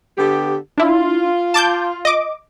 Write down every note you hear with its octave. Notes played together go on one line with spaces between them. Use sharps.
D3 B3 G4
D4 E4 F4
A5 D6 G6
D#5 D6